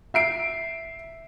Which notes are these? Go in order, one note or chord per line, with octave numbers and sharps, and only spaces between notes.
E5 C7 D7